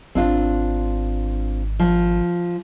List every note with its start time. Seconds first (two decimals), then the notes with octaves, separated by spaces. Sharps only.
0.15 G#1 C4 D4 F4
1.80 F3